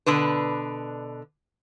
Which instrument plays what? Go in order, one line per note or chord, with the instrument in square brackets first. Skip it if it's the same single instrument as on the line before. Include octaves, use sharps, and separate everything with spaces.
[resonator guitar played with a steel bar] B2 D3 D4 B4